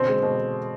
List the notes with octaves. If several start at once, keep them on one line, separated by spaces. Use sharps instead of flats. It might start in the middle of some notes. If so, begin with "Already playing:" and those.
Already playing: B2 D3 C4
G#3
B2